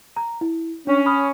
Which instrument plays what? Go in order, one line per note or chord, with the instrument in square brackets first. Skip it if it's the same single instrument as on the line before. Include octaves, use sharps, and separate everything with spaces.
[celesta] A#5
E4
[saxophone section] C#4 [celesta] D4
[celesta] B5 D#6 F6